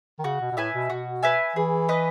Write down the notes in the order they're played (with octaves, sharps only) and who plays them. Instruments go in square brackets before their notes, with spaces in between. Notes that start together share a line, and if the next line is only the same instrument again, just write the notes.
[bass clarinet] D#3
[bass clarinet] C#3 [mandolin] F#4
[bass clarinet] B2
B2
[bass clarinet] A2 [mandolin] B4 E5 G#5
[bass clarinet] B2
[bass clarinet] B2 [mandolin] F#4
[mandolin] B4 E5 G#5
[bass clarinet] E3 [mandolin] G#4
[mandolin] B4 D#5